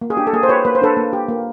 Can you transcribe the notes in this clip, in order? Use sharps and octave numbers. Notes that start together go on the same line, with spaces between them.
A#3
G#4
D4 G4
A4
A#3 G#4
C5
G4 B4 C#5
A#3 B4
C5
D4 A4 B4
A#3
G4
A#3